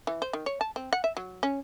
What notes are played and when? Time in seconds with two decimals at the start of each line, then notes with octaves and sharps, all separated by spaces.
0.07 E3
0.22 C5
0.33 D#3
0.46 C#5
0.61 A5
0.76 C4
0.93 F#5
1.04 E5
1.17 F#3
1.43 C#4